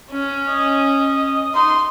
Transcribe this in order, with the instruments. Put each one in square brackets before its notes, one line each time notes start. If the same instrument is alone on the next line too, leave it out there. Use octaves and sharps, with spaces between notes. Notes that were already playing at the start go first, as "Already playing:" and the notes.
[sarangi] C#4
[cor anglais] D#5
[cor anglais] D#4 [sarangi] C6